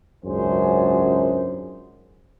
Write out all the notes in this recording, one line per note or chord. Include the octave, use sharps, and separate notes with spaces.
G#1 C#2 F#2 D4 G#4 C5